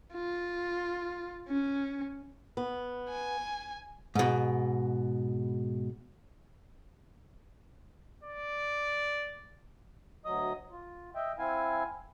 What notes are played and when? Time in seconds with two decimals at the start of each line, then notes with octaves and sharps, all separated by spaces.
0.14 F4
1.49 C#4
2.57 B3
3.10 G#5
4.15 G#2 B2
8.23 D5
10.25 D2 F#3 D#5 D#6
10.71 F4
11.15 D#5 E5 G5
11.38 C4 E4 F5 G#5